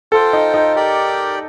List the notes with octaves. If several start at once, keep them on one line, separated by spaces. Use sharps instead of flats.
F4 A4 C5 G5
D#4
D#4
G4 A#4 D5 G5